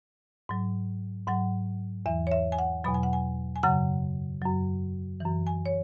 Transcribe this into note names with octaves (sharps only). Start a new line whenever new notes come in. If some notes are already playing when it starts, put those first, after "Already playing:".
G#2 F#3
G#2 F#3 F#5
E2 E3 E5
C#5
E5
G#5
F#5
E2 B2 F#3 B5
G#5
F#5
G#5
G#5
F#2 C#3 F#3 F#5
F#2 F#3
F#2 E3
G#5
C#5